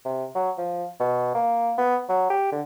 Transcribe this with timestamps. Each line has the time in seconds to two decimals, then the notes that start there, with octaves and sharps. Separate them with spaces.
0.05 C3
0.35 F#3
0.58 F3
1.00 B2
1.35 A#3
1.78 B3
2.09 F#3
2.30 G4
2.52 D3